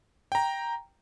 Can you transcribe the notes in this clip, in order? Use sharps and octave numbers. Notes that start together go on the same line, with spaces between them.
G5 A#5